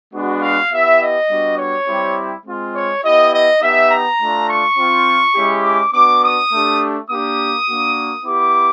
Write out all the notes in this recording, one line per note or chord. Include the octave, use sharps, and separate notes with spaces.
G#3 B3 D4 F#4
F5
B3 E4 G4 E5
D#5
G3 B3 D4 F#4
C#5
G3 C4 E4 G4
G#3 C4 F4
C#5
B3 E4 G4 D#5
D#5
B3 D#4 G4 E5
A#5
A3 D4 F4
C#6
C4 F4
G#3 C#4 E4 G4
D6
B3 D4 F#4 D6
D#6
A3 D4 G4
A#3 D4 G4 D#6
A#3 D4 F#4
B3 E4 G4 D6